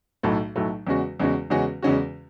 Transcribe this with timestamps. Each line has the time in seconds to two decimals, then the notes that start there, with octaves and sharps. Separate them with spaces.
0.23 B1 A2 F#3 A3
0.56 B1 A2 F#3 A3
0.87 E2 C#3 G#3 C#4 F#4
1.20 E2 C#3 G#3 C#4 F#4
1.50 E2 C#3 G#3 C#4 F#4
1.83 E2 C#3 G#3 C#4 F#4